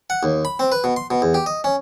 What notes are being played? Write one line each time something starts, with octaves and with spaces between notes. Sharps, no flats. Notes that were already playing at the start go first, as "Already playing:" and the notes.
F#5
D#2
B5
C4
B4
B2
C6
B2
E2
G4
D#5
C#4